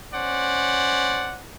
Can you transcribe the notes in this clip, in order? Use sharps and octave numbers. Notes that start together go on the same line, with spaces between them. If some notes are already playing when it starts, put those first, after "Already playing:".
C#4 C5 D5 F#5